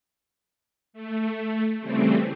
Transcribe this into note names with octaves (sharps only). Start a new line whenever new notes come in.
A3
C#3 E3 G3 A3 C4